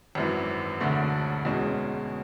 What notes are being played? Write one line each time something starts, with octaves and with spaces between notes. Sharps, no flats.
G#1 F#2 E3
E1 D2 D3 A3
E2 B2 G#3 C#4